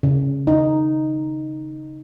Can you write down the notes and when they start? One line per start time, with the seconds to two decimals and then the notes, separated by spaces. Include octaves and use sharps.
0.03 C#3
0.47 D#4